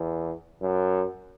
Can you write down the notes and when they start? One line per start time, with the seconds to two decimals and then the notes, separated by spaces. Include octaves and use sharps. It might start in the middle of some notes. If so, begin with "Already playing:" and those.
Already playing: E2
0.61 F#2